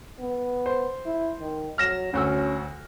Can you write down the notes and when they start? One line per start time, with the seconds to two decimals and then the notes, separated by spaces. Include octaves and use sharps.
0.19 B3
0.66 C5
1.06 E4
1.41 D#3
1.78 F#3 F6 A#6 E7
2.13 D2 C#4 F#4 E6